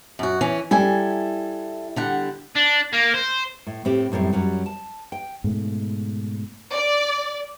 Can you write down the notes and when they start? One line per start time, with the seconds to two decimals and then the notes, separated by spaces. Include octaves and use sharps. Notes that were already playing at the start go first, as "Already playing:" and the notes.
0.19 F#2 F#4
0.41 E3 C#4
0.71 G3 E4 A4 G#5
1.96 D3 G3 F#5
2.55 D4
2.93 A#3
3.14 C5
3.67 A2
3.85 A2 C4 G4
4.12 F#2 A2 G3 C4
4.33 F#2 F#3 G3 C#4
4.66 A5
5.12 G5
5.44 G#2 B2 A3
6.74 D5